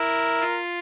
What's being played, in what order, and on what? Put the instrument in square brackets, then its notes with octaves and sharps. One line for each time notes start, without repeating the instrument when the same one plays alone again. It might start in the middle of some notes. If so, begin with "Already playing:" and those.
Already playing: [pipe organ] E4 [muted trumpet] A#4
[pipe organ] F4